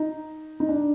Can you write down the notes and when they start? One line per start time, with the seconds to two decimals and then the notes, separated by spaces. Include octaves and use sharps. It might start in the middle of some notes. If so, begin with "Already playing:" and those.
Already playing: D#4
0.60 D#4
0.69 D4